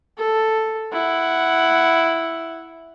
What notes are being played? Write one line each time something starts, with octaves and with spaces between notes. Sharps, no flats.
A4
E4 F#5